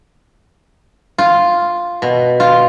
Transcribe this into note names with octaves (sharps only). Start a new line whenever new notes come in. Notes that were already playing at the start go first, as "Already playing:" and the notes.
F4
B2
F4